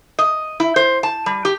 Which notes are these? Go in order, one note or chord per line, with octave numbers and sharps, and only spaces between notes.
D#5
E4
C5
A5
G3
G4